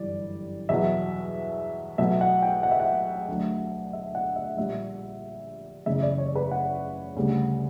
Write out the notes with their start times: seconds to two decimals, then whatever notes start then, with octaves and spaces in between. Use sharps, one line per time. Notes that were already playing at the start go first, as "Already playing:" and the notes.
Already playing: G1 F#2 E3 G3 D5
0.69 E2 B2 F#3 E5
1.98 B1 B2 F#3 E5
2.21 F#5
2.42 G5
2.63 F#5
2.71 E5
2.80 F#5
3.28 D2 D3 F#3
3.93 E5
4.15 F#5
4.36 E5
4.57 A#1 A#2 G3 E5
5.86 F#1 E2 C#3 E5
6.03 D5
6.18 C#5
6.35 B4
6.51 F#5
7.16 D2 C#3 G3